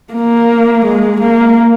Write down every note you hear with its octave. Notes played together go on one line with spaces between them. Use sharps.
A#3
G#3
A#3